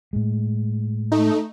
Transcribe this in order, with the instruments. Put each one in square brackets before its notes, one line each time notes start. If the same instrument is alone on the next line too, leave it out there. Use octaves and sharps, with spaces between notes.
[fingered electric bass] A2 G#3
[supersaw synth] A3 D#4